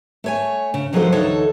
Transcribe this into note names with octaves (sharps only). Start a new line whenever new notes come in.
A3 C#5 G#5
C#3
D#3 F3 F#3 G#3 A4 C5
D2 E3 D#4 A4 C#5